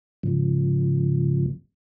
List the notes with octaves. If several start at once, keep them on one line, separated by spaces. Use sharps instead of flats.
G#2 C#3 F3